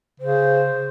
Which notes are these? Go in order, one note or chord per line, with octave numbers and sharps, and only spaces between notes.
C#3 C5